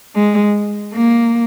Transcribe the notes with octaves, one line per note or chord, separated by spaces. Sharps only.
G#3
A#3